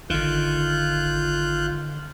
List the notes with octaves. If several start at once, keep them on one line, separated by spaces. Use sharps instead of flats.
G#1 D3 D#3 F4 F#6 G6